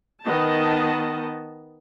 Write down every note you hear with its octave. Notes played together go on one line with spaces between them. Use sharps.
D#3 B3 D#5 A5